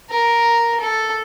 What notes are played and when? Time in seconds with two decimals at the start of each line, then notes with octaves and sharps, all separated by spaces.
0.10 A#4
0.80 A4